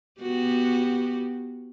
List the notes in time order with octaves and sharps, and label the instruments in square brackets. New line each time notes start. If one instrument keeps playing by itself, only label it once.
[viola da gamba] B3 F#4 G4